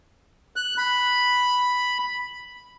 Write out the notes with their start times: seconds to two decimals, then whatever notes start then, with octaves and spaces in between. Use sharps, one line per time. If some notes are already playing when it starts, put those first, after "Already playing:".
0.56 F#6
0.78 B5